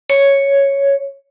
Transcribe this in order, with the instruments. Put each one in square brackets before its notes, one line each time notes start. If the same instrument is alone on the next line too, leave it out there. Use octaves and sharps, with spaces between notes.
[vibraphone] C#5